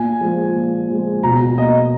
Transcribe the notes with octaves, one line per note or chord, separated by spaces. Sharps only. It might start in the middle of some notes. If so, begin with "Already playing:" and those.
Already playing: A#2 G#5
F3 G#3
A#2
F3 G#3
B2 A#5
A#3 D#5